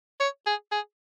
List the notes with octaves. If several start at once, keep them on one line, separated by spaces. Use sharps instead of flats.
C#5
G#4
G#4